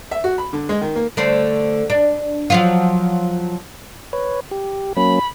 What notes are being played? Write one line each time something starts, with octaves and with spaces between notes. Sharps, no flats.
E5
F#4
B5
D3
G#3
D#3
A#3
D3 A3 C5
D4
F3 F#3 F4
B4 C#5
G4
F#3 A#3 C#4 B5